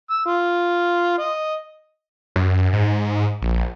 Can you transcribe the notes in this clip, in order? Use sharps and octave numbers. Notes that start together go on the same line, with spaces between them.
E6
F4
D#5
F#2
G#2
A#1